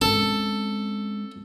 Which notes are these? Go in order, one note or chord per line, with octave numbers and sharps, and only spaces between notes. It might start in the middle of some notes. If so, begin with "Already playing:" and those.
G#3 C4 C#4 A4